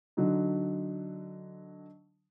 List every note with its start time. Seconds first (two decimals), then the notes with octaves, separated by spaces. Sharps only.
0.17 D3 F#3 D#4